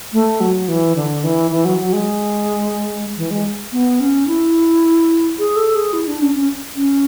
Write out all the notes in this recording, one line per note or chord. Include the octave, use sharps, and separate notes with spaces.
A3
F#3
E3
D3
E3
E3
F#3
F#3
G#3
E3
G#3
B3
C#4
E4
G#4
A4
G#4
E4
D4
C#4
C#4
C#4